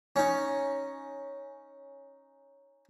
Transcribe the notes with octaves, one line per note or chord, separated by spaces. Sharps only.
C#4 D#4